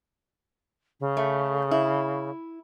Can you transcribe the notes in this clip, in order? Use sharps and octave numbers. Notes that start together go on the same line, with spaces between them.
C#3
A3
E4